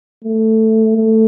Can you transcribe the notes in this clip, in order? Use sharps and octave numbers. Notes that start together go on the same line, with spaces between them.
A3
A3